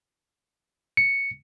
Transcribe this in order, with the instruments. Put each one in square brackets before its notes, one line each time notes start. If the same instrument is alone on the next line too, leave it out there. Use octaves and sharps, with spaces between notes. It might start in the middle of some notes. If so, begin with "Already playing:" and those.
[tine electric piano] C#7